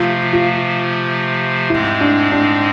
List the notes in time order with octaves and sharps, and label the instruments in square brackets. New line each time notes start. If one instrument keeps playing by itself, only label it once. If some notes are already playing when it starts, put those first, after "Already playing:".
Already playing: [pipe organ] C3 F3 A3 [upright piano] F4
[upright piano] F4
[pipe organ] G#2 G#3 C4 [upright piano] E4
[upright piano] D4
D4